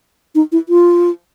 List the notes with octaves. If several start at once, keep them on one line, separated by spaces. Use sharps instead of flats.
D#4
E4
F4